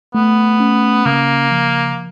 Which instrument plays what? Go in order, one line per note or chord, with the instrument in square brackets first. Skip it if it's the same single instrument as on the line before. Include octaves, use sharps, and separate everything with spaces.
[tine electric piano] A3 [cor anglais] B3
[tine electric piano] C#4
[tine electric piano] C#3 [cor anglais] A#3
[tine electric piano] F3